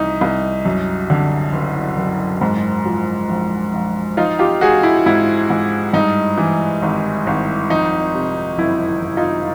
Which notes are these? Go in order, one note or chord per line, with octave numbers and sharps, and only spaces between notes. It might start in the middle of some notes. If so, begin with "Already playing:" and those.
Already playing: C2 D#4
C2
F#2
D3
F#1
F#1
G#2
F3
A#1
A#1
F3 D#4 F4
F4 G4
G#3 F#4 G#4
E4
G#2 E4
G#2
G2 D#4
E3
G#1
G#1
F2 D#4
C3
F#1 E4
F#1
D#4 F4